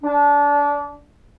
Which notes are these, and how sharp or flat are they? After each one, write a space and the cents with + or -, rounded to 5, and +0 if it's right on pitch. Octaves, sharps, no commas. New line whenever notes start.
D4 -25